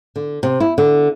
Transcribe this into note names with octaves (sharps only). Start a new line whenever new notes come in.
D3
C3
E4
D3